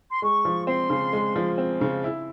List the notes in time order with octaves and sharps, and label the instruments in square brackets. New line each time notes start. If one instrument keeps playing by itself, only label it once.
[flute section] C6
[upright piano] G#3 [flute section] C#6
[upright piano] F3
[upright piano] C4 [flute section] C6
[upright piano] C#3
G#3
F3
C4
C#3
E4